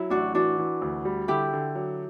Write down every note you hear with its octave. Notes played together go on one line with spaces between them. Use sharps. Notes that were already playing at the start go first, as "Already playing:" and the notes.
Already playing: F#3 E4
A1 D4 F#4
E3 D4 F#4
E3
D2
G3
D3 E4 G4
D3
F#3